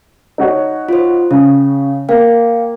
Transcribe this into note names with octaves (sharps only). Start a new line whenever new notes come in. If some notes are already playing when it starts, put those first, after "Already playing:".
D#4 F#4 C#5
F4 C5
C#3 C#4
A#3 F5 G5